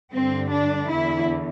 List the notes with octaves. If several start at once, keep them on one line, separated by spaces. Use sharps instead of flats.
G2 D3 C4
D4
E2 D3 E4